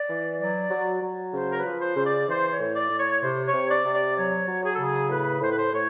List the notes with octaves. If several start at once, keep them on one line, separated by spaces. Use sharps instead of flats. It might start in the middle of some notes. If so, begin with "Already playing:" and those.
Already playing: D5
E3
F#3 D5
F#3
F#3
C#3 C5
A#4
B4
F3
C5
C#3
D5
E3 C5
C#5
A2
D5
A2
C#5
C3 C5
C#5
C3
D5
C3
D5
F#3 C#5
F#3
G#4
A4
C#3 G#4
A2 B4
A2 C5
B4
C5
A2 C#5